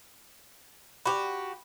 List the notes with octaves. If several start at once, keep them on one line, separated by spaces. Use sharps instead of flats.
F#4 G4 B5